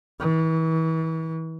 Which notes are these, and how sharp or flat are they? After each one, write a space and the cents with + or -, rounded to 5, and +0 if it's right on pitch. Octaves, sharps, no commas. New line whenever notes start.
E3 -35